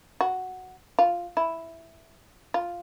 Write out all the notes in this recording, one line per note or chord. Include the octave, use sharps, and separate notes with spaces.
F#4
F4
E4
F4